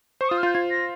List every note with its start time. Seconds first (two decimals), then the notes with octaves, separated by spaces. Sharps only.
0.21 C5 C#6
0.29 F4 D#6
0.38 F6
0.43 F4
0.46 G6
0.54 F4 G#6
0.71 A#6